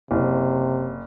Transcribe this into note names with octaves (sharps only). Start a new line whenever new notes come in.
F#1 C3